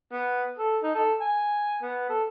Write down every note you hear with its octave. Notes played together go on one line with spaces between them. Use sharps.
B3
A4
D#4
A4
G#5
B3
A4